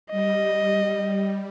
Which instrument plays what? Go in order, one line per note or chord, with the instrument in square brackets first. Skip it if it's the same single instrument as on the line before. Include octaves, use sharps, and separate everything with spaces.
[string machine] G3 [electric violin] D#5